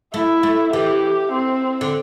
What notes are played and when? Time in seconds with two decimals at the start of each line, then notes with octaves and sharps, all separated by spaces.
0.14 A3 E4
0.43 A3
0.73 E3 G4
1.32 C4
1.81 D3